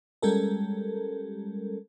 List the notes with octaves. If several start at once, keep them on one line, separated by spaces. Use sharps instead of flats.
G3 G#3 C#4 G4 A4 A#4